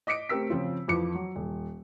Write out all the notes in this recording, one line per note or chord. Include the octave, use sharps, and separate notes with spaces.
D#5 D6 B6 C#7 D7
A3 C4 G4 A#4 E6 B6
C#3 F3 C4 F4
F2 E3 F3 B4 D6 C#7
F#3
D#1